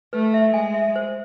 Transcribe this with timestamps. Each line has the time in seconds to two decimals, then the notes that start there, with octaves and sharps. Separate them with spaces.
0.13 A3 B4
0.34 E5
0.54 G#3 G#5
0.74 E5
0.96 C5